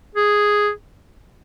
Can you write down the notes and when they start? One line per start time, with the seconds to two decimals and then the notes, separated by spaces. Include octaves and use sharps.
0.15 G#4